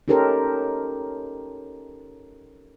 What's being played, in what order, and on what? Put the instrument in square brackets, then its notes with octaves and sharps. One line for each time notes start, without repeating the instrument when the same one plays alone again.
[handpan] C#4 D#4 G4 A4 A#4 C5